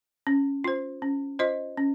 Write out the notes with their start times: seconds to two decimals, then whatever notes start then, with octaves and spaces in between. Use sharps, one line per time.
0.27 C#4
0.64 F4 C5
1.02 C#4
1.39 F4 C5 D#5
1.77 C#4